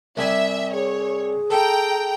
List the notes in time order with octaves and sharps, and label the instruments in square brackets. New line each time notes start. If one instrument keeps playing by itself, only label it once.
[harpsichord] C2 G3 G#5 [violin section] E5
[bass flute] G#4 [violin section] C#5
[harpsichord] A4 [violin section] G5 A#5